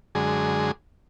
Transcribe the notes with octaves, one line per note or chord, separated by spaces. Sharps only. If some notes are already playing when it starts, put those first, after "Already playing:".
F#2 D3 G#3 G#4